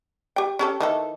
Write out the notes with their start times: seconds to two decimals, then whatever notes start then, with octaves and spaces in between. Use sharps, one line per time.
0.36 G4 G5
0.59 C#4 G4 A4
0.80 D#3 E3 A4